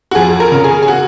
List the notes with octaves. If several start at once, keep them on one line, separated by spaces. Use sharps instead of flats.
F#4
F2 G#4
A#4
C#3
G#4
G#4
F#4